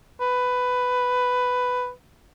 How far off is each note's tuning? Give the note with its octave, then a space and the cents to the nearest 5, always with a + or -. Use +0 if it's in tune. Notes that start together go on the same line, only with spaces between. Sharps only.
B4 +10